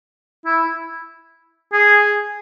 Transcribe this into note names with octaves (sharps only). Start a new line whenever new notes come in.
E4
G#4